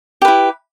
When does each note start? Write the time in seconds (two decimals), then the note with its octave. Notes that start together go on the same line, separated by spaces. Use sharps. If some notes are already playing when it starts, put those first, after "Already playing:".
0.22 G4
0.25 B4
0.28 E4